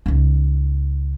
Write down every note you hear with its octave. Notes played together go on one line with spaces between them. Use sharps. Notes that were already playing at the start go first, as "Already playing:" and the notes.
C#2 D#4